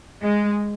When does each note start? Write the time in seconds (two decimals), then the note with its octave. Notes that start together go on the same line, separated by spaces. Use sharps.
0.21 G#3